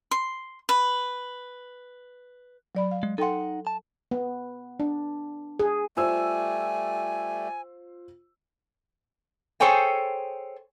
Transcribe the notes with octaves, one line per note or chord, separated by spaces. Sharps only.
C6
B4
F#3 D5 B5
F5
G#3
D#4 A4 F#5 G5 C6
A5
B3
D4
G#4
G3 A3 F4 C5 G#5 E6
G#4 A4 C5 C#5 G5 G#5